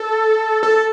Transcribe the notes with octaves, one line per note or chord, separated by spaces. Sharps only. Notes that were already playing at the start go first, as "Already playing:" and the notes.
Already playing: A4
A4